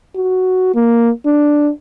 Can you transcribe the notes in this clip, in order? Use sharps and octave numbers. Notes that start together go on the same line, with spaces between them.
F#4
A#3
D4